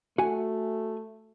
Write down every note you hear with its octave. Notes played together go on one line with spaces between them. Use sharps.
A3 F#4 G#5